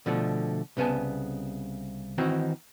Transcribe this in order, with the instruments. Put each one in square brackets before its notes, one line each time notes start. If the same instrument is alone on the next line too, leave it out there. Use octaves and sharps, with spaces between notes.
[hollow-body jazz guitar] B2 D3 F3 A3
C2 C#3 B3 G#5 A5
D#3 E3 C4 D#4 F#4